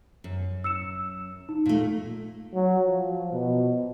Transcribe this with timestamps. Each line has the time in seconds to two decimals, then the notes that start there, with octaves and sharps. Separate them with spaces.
0.24 F#2
0.64 E6 C#7 E7
1.49 D#4
1.66 A#2 A3
2.54 F#3
2.85 F3
3.33 B2